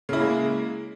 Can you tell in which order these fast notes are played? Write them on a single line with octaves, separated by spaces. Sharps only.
C#3 E4 A#3 G#3